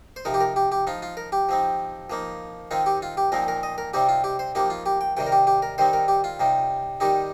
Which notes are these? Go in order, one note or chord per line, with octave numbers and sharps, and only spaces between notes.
C5
C3 F3 D#4 A#4
G4
A#4
G4
G4
F3 D#4 F4
F4
A#4
G4
F3 C4 D#4
F3 A#3 D#4
D#3 C4 D#4 F4
G4
F4
G4
A#2 F3 C4 D#4 A#4
A#4
D#5
A#4
C3 G3 C4 D#4 G4
F4
G4
C5
F3 A#3 D#4 G4
F4
G4
G5
C3 D#3 G3 G5
A#4
G4
G4
A#4
D#3 G3 C4 D#4 C5
A#4
G4
F4
C3 G3 D#4
D#3 G3 D#4 G4